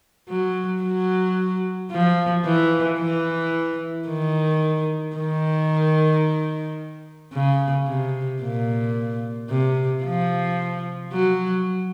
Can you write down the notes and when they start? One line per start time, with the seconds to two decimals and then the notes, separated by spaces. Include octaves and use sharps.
0.29 F#3
0.83 F#3
1.91 F3
2.45 E3
2.99 E3
4.08 D#3
5.16 D#3
7.33 C#3
7.87 C3
8.42 A#2
9.50 C3
10.04 F3
11.12 F#3